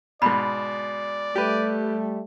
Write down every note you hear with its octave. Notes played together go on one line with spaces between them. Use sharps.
G#2 B2 D5 B5
G3 A3 G4 B4